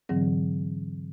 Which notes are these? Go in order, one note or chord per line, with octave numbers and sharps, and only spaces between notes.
G#2 D3 E3 F#3 C4